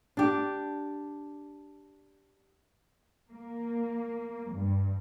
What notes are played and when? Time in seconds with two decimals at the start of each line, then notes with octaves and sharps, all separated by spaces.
0.17 D4 G4
3.30 A#3
4.52 G2